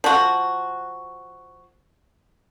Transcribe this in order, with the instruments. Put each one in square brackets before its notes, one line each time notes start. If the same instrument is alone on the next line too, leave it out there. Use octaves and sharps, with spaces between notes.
[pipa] F3 F#4